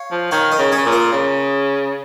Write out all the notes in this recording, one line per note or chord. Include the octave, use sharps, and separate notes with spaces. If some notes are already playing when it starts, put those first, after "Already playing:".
Already playing: C#5 F5
F3
D#3 C#5 F5
A#4 D#5
C#3
G#4 C#5
C#3
A#2
F4 A#4
C#3